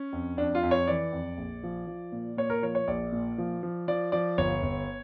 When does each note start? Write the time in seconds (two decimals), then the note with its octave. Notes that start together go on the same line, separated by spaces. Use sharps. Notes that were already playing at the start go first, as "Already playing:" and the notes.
Already playing: C#4
0.13 F2
0.37 F2 D4
0.55 F4
0.63 F2
0.71 C#5
0.87 E3 D5
1.12 F2
1.38 A#1
1.63 F3
1.87 F3
2.12 A#2
2.37 A#2 C#5
2.50 A#4
2.62 F3 C#5
2.75 C#5
2.88 A#1 D5
3.12 A#2
3.38 F3
3.63 F3
3.88 F3 D5
4.12 F3 D5
4.38 G1 C#5
4.63 G1